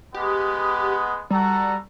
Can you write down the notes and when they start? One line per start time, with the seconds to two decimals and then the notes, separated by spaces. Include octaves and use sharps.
0.14 G#3 B3 G4
1.30 G3 F#4 A4 A#5